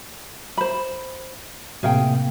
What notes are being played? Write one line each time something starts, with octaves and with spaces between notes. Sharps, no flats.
C5 B5
A2 C3 A#3 G#4 F5 G5